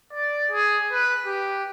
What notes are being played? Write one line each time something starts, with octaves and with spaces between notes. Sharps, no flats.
D5
G#4
B4
G4